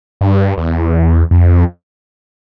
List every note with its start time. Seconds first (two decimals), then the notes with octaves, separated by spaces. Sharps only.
0.21 G2
0.57 E2
1.31 F2